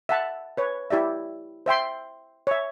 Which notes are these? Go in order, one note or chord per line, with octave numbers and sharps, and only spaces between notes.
E5 F#5 A5
B4 C#5
E4 G4 D5 E5
C5 E5 G5 C6
C#5 E5